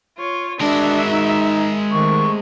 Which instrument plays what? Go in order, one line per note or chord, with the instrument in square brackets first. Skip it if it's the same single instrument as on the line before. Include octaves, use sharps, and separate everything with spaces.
[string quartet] F4 C#5
[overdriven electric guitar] G#3 A#4 [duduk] D4 [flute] F#4 [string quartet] E5 B5
[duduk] D#4
[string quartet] C3 A3 [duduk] D#3 [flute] C#6